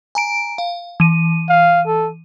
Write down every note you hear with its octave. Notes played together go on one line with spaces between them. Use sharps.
G#5 A#5 D7
F5
E3 D#7
F5
A4